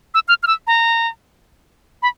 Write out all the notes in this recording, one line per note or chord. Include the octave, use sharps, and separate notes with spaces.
E6
F6
F6
E6
A#5
B5